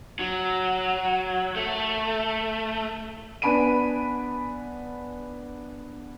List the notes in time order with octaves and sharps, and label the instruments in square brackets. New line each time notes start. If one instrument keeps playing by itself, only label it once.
[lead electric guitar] F#3
A3
[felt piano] B3 D4 G#5 B5 D7 D#7